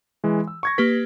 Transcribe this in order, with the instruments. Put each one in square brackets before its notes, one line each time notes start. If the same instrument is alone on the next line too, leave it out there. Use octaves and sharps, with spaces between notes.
[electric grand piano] E3 G#3
E6
C#6 G#6 A#6
[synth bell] A#3 G4 B4 [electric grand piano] B6